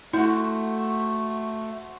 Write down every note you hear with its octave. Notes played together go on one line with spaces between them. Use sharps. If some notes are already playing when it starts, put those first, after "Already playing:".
A3 E4 F#4 C5